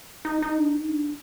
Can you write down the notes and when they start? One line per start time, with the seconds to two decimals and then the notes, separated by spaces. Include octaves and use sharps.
0.25 D#4
0.42 D#4
0.58 D4
0.74 D#4
0.91 D4